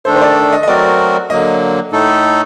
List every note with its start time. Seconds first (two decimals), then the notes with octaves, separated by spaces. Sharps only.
0.05 D#3 A3 D4 A4 C5
0.16 C5
0.21 D5
0.52 D#5
0.63 D#5
0.68 F#3 A3 C4 F#4 A#4 D5
1.30 D3 F#3 A#3 D#5
1.92 A2 A3 D#4 A4